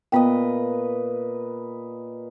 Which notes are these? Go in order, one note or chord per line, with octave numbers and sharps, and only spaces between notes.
A#2 B3 B4 D#5 G5